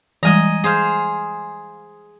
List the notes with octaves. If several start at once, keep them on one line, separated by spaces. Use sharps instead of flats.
E3 G3 G#3 D#5 G#5 A#5
G#4 C5 F5